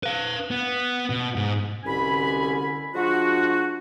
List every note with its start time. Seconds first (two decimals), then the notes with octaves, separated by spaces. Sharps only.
0.03 B4 F5
0.51 B3
1.10 B2
1.36 G#2
1.85 C2 B2 D3 C#4 G#5 B5
2.94 F3 G#3 D4 F4 F#4